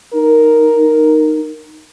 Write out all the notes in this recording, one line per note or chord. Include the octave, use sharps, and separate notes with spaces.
D#4 A#4